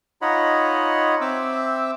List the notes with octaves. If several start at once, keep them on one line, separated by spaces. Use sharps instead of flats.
D#4 F4 C#5 D#5 F#5 B5
C4 E5 D6 E6